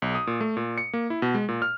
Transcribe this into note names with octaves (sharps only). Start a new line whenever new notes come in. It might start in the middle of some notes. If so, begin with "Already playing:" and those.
B1
D#6
A#2
A3
A#2
C#7
A#3
E4
B2
G#3
A#2
F6